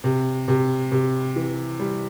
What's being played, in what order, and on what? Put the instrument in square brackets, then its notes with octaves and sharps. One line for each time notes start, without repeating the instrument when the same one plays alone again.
[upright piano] C3
C3
C3
E3
G3